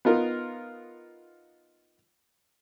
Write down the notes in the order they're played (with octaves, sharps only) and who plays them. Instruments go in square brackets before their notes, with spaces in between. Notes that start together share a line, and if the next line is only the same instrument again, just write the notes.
[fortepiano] B3 D#4 F4 A#4